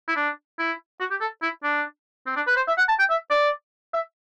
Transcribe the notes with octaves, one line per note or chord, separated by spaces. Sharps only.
E4
D4
E4
F#4
G4
A4
E4
D4
C4
D4
B4
C5
E5
F#5
A5
G5
E5
D5
E5